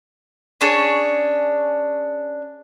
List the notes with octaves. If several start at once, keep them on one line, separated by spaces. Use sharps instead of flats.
C#4 D4 G#4 C#5